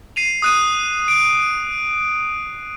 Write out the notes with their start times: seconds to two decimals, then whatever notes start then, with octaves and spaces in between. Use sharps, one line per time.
0.16 C7 D#7 F7
0.42 D#6 F#6 D#7
1.08 D7